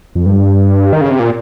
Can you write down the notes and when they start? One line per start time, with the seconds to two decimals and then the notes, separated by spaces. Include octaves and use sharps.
0.15 F2
0.26 G2
0.93 D#3
1.01 C#3
1.11 C3
1.19 A#2